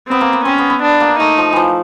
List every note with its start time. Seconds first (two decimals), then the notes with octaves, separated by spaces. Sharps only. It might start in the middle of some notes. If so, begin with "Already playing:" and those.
0.08 B3 C4
0.21 A#3
0.33 B3
0.45 C4 C#4
0.58 B3
0.70 B3
0.83 D4
1.00 A#3
1.20 A3 D#4
1.38 F3
1.53 E3 F3